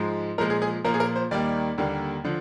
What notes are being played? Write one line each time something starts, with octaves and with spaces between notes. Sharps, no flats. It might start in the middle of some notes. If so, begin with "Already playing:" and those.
Already playing: G#2 F3 G#3
A#2 F3 G#3 A#4
G#4
G#4
A#2 F3 A#3 A#4
G#4
A#4
C5
D#2 D#3 G3 A#3 D5
D#2 D3 G3 A#3
D3 F3